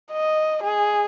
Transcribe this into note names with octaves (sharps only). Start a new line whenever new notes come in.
D#5
G#4